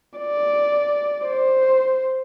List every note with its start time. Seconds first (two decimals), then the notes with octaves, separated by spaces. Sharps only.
0.19 D5
1.27 C5